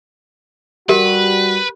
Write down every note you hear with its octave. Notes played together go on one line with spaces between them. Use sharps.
G3 F#4 G4 A#4 B4